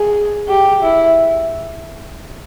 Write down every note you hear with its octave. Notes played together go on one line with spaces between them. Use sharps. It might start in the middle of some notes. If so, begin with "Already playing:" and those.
Already playing: G#4
G4
E4